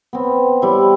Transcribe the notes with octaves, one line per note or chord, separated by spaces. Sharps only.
B3 C4
G3 E4